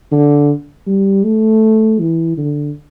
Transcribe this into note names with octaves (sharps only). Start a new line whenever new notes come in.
D3
G3
A3
E3
D3